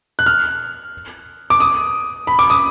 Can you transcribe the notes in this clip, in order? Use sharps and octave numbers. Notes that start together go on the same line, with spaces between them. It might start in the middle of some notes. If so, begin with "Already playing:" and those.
F#6
F6
D6
D#6
B5
D6
D#6